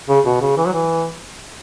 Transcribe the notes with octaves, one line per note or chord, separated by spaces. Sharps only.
C#3
B2
C#3
E3
F#3
E3